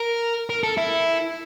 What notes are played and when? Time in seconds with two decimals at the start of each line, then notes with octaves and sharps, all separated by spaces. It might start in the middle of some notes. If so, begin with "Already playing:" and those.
Already playing: A#4
0.50 A#4
0.63 A4
0.77 E4